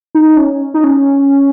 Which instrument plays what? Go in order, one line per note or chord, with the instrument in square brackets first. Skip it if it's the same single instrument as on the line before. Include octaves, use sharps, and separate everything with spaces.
[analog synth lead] D#4
C#4
D#4
C#4